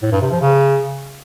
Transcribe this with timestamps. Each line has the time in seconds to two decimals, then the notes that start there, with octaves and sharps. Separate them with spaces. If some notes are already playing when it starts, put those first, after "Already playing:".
0.02 A2
0.12 G2
0.21 C3
0.31 F3
0.41 C#3